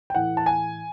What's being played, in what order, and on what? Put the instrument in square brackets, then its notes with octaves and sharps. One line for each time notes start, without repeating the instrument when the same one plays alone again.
[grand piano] G5
A2 E3 F#5
A5
G#5